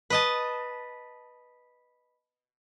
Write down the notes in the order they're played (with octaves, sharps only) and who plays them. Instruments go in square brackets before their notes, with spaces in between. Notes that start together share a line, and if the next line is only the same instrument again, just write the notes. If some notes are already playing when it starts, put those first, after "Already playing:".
[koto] B4 D#5 A5